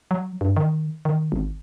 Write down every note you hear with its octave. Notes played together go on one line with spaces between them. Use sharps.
F#3
G2
D#3
D#3
G#1